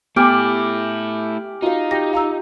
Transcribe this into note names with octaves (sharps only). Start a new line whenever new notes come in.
A3 B3 E4 G4 G#5 D6 F6 D7
D#4 F4 F#4 F5
G4 A#6
F5 A#5 E6